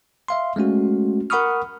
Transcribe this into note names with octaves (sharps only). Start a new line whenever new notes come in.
E5 F5 C6
G#3 A3 C#4 F#4
A#4 F#5 B5 C#6 D#6 F6